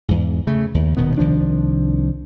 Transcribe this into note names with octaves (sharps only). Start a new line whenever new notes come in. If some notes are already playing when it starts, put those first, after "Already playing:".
E2 G#2
C#3 A3
D#2
D#1 B2 D#3 B3
C2 D#3 F3 D4